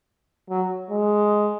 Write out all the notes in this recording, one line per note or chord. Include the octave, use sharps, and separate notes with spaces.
F#3
G#3